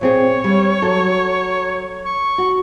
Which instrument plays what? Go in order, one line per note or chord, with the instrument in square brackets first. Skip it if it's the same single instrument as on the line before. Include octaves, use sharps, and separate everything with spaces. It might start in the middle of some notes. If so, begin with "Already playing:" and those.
[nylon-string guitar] A#2 C4 G#4 [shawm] C#5
[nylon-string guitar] G3 A#3
F#3 A4
[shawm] C#6
[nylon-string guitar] F#4